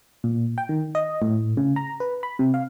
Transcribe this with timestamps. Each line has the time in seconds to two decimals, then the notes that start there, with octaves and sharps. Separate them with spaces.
0.24 A#2
0.58 G5
0.69 D#3
0.95 D#5
1.22 A2
1.57 C#3
1.76 A#5
2.00 B4
2.23 B5
2.39 C3
2.54 F5